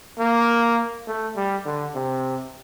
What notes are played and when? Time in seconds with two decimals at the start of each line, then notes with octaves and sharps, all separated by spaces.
0.19 A#3
1.07 A3
1.36 G3
1.65 D3
1.95 C3